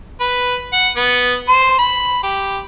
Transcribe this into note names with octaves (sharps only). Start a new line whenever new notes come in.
B4
F#5
B3
C5
B5
G4